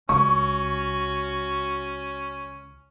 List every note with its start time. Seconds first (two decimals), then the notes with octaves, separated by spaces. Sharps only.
0.09 C#2 C#4 F#4 C#6